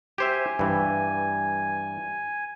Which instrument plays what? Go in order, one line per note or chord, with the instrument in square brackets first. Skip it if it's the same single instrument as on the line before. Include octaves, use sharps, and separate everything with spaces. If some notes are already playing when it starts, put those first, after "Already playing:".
[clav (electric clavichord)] G4 C5 E5 [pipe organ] G#5
[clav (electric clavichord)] G2 E3